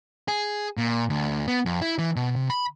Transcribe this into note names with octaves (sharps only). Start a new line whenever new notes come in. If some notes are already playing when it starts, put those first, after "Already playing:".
G#4
A#2
D2
B3
F2
E4
E3
B2
C3
B5